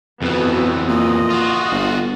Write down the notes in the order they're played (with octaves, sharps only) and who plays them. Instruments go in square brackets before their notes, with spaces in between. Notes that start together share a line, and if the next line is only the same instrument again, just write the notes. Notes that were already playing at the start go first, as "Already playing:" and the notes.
[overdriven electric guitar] F2 E3 [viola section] B3 F#4
[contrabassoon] A#2 [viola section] D#5
[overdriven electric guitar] F4 F#4
[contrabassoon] G1